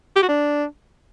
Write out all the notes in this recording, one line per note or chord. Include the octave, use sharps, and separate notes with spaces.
G4
F#4
D4